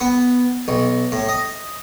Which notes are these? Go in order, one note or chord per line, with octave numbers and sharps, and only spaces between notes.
B3
B1
A2
D#5